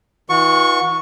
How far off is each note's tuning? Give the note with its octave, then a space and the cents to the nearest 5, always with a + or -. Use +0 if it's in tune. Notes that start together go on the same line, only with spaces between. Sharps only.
E3 -30 F#4 -45 C#6 +0